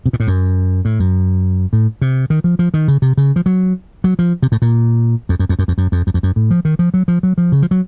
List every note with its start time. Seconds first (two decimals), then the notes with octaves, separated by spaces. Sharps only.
0.06 C3
0.13 A#2
0.20 A2
0.27 F#2
0.85 A2
1.00 F#2
1.73 A2
2.02 C3
2.30 D#3
2.44 F3
2.59 F3
2.74 D#3
2.88 C#3
3.02 C3
3.17 C#3
3.36 F3
3.46 F#3
4.04 F#3
4.19 F3
4.43 C3
4.52 A2
4.62 A#2
5.29 F2
5.39 F#2
5.49 F2
5.59 F#2
5.68 F2
5.78 F#2
5.92 F2
6.07 F#2
6.14 F2
6.23 F#2
6.36 A2
6.51 F3
6.65 D#3
6.79 F3
6.94 F#3
7.08 F3
7.23 F#3
7.38 F3
7.52 C#3
7.62 F3
7.71 F#3